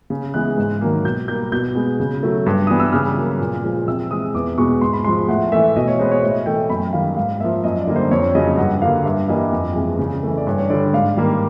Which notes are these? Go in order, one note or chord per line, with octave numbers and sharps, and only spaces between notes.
C#3
E3 G#3 B3 F#6
G#2
D#3 F#3 A#3
B2 G6
G3 A#3 G6
B2 G6
G#3 B3
C#3
F#3 A3
G2
E3 G3 B3 D#6
E6
C#3 F6
F#3 A#3
A#2
F3 G#3
C3 E6
E3 G#3 D#6
E2 D6
B2 G#3 B3 C#6
G#2 C6
B5
F3 G#3 C6
A2 F#5
E3 A3 E5
B2 D#5
C#5
G#3 B3 C5
C#5
A2 D#5
E3 A3 G5
F#2 B5
D#3 G3 F5
G#2 F5
F3 A#3 E5
F#2 D#5
D5
D3 G3 A#3
C5
F2 C#5
C#3 F#3 D#5
G2 F#5
D3 G3 A#3 F5
G2 E5
E3 G3 A#3 D#5
F2
C3 E3 G#3
C#3
E3 A3
D5
G2 C#5
C#5
D3 G3 D5
G#2 F5
D#3 G3 A#3